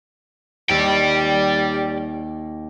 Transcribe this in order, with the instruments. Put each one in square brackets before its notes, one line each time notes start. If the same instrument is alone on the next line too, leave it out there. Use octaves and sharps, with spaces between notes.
[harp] D#2 [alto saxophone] G3 [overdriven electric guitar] D5 G5